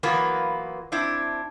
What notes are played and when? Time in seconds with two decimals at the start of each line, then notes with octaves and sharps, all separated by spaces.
0.03 E3 F#3 A#3 B3 F4
0.92 C4 D4 E4